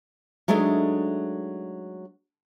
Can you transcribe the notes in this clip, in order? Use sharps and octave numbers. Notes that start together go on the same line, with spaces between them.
F#3 G#3 A3 D4 D#4